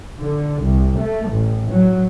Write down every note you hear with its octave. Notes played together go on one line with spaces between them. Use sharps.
D3
C2
A3
A1
F#3